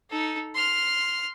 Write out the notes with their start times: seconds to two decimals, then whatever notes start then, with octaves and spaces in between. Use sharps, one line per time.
0.10 D#4 A4
0.55 C6 F6